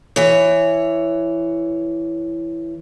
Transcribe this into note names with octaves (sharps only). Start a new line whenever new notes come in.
E3 C#5